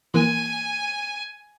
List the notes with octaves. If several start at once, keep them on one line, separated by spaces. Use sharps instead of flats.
E3 A#3 G#5